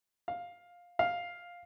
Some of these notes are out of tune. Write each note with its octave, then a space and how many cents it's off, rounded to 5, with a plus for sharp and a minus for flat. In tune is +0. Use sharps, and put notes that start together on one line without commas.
F5 +10
F5 +5